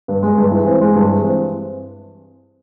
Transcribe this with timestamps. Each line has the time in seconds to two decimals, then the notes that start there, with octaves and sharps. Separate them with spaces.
0.08 G2
0.23 G#3
0.37 G2
0.52 E3
0.66 C4
0.81 G#3
0.95 G2
1.09 E3
1.24 C4